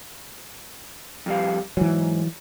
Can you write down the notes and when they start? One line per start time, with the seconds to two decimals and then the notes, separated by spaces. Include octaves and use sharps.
1.26 F2 G3 F5
1.77 G#2 E3 F#3